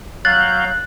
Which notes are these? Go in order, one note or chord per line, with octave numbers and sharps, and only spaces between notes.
F#3 F5 F#6 G6 A6